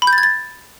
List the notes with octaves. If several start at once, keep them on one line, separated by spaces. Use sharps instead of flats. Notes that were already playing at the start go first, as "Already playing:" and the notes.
B5
G6
A6
G#6
A6